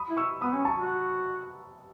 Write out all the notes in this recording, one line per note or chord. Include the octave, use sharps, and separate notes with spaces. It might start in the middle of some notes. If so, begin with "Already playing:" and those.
Already playing: B5 D#6
E4
C#6 E6
B3 B5 D#6
C#4
A5 C#6
F#4